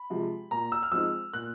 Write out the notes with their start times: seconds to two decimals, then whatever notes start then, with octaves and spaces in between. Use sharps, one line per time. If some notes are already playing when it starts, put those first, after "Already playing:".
Already playing: B5
0.10 C3 F3 G#3
0.51 A#2 A#5
0.72 E6
0.83 F6
0.92 F3 G#3 C4 D#4 E6
1.33 A#2 F#6